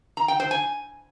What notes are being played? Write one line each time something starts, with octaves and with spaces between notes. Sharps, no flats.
A#5
G5
C5
G#5